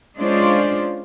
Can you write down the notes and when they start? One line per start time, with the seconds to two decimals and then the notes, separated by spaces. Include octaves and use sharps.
0.17 G#3 C#4 D4 F4 C5 D5